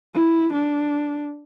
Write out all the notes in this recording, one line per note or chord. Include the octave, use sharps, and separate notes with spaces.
E4
D4